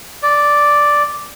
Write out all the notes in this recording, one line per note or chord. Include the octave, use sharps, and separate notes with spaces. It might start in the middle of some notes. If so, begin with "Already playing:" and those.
D5